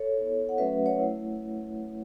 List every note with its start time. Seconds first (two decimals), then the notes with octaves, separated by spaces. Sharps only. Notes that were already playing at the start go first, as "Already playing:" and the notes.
Already playing: A4 C#5
0.17 B3 E4
0.49 F#5
0.58 F#3 A3 C#4 F#4 B4 E5
0.86 C#5 F#5
0.99 A3 E4